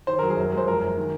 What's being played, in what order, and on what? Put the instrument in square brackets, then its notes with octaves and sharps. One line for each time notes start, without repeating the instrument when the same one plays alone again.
[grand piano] D#3 C5
F#3 A#4
G#4
F#2 A#4
G#3 C5
F3 A#4
F#2
D#3